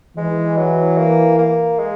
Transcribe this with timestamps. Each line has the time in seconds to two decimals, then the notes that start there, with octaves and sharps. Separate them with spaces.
0.17 E3 G#3
0.57 F#3
0.97 A#3
1.38 A#3
1.79 G#3